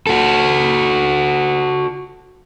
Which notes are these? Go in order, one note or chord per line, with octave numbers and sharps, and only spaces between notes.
F#4 A4